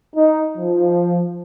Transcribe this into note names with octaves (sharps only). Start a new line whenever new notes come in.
D#4
F3